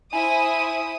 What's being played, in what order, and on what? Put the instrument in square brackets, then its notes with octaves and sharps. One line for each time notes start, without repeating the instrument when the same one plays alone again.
[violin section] E4 C5 D#6 [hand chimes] G#5